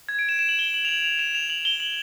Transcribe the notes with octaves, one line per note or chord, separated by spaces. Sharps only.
G#6
D7
E7
E7
F#7
G7
F#7
F7
F#7
F7
E7
F7
F#7
G7
F#7